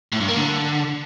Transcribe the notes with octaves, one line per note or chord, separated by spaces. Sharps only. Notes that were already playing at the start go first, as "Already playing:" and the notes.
A2
G2
A#3
D3